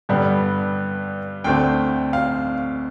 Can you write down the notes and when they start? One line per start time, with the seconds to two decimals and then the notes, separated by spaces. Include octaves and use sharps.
0.09 G2 D3 G3 B3
1.44 D2 D3 A3 C4 G5
2.13 F5